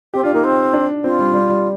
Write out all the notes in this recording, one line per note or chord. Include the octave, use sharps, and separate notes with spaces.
C4 G4
D4 F4
A#3 D#4
C4
D4
C4 F4
G3
G3
G3